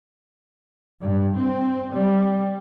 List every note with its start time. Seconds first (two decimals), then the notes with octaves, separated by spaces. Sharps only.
1.01 G2
1.36 C4
1.95 G3